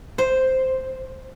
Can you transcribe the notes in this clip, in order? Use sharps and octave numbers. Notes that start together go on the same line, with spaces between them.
C5